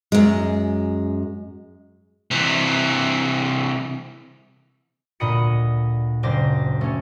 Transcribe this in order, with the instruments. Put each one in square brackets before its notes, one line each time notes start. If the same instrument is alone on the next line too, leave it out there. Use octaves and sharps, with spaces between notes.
[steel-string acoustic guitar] F#2 G#3
[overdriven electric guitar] C3 E3
[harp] D2 A#2 D#5 B5 D#6 C#7
F#1 C5 D6 A#6 E7
A3 C#4